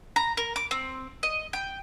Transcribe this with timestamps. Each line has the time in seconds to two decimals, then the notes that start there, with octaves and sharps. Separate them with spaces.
0.16 A#5
0.37 A#4
0.56 D6
0.71 C4
1.23 D#5
1.53 G5